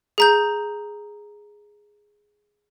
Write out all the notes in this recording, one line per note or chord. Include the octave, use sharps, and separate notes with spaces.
G#4 A#5 G6